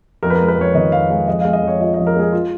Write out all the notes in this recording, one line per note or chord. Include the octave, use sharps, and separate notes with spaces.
F2 A#4
B4
G#3 A#4
B4
F2 C#5
D#3 D#5
F2 F5
G#3 F5
F2 D#5
G#3 F5
D#5
F2
C#5
F3 D#5
F2 D#5
A#4
G#3 G#4
F4